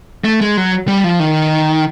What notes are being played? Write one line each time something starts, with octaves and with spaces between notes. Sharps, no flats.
A3
G#3
F#3
G3
F3
D#3